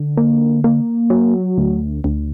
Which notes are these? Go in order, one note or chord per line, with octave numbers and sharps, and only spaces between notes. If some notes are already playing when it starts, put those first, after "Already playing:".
Already playing: D3
A#3
A#3
F#3
D2
D2